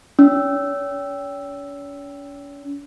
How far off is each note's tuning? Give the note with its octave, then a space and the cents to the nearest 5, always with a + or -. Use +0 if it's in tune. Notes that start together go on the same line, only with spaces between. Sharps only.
C#4 +40 E6 +0